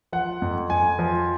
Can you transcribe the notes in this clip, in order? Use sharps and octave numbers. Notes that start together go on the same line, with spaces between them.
F3 F#5
F2
F2 G#5
F3